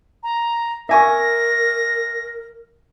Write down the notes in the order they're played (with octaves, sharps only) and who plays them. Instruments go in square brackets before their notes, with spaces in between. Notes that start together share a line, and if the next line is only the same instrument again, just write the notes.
[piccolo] A#5
[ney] A#4 [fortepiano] E5 G#5 C#6 [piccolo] A#6